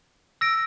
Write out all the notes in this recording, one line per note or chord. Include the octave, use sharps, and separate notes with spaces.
E6 A#6 D7